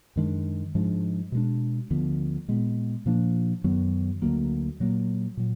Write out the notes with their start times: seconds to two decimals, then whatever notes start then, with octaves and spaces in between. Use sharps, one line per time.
0.16 F#2 D#3 G#3 D4
0.75 G#2 F3 G#3 D4
1.32 B2 G#3 D4
1.90 D2 D3 F3 B3
2.48 A#2 G#3 B3
3.06 A#2 F3 A#3 D4
3.64 F#2 D#3 F#3 B3
4.22 D2 D3 F#3 A#3
4.80 A#2 F#3 A#3
5.37 A#2 F#3